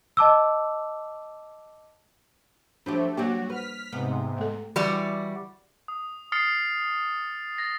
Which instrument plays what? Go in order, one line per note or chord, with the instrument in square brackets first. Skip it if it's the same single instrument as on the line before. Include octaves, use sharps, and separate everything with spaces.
[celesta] D#5 A5 D6 E6
[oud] F3 F#3 G4 [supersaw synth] A3 [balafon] D4
[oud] F#3 G3 G4 [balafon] A#3 [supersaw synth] F#4
[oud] B4 [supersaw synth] F6 B6
[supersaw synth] G#2 C3 [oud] B3
[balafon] A3 A4
[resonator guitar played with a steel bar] E3 G3 F#4 D5
[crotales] D#6
D#6 F6 A6 C7 C#7
A6 A#6